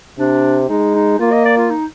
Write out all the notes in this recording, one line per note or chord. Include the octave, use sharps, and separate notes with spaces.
C3 D4
G#3 D#4
D#4
A#3 F4
D#5
D5
F4
D#4